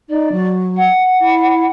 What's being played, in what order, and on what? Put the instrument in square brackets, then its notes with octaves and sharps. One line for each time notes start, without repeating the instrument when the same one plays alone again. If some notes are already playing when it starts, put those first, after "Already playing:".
[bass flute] D#4 [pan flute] D5
[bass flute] F#3
[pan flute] F#5
[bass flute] E4